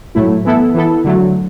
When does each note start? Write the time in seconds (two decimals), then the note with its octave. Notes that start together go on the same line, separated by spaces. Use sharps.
0.15 A2 F#3 A3 E4
0.45 E3 B3 E4 A4
0.74 E3 B3 E4 A4
1.04 D3 F#3 A3